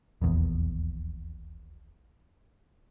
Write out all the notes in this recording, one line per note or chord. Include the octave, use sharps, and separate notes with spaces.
D#1 A#1 E2